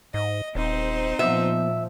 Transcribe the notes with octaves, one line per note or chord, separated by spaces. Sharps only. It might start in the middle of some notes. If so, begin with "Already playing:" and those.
G#2 D#5
D#1 C4 D#4 C5
A#2 F3 B3 E5